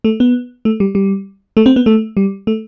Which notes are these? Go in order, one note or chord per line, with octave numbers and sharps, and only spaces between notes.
A3
B3
A3
G3
G3
A3
C4
B3
A3
G3
A3